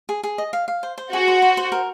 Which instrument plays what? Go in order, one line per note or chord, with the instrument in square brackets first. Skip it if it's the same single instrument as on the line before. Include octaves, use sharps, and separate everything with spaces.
[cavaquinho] G#4
G#4
D#5
F5
F5
C5
C5
[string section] F#4 [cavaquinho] G#4
[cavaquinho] C5
C5
C5
A#4